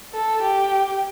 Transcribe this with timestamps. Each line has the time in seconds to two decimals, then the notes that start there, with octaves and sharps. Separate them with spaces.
0.14 A4
0.42 G4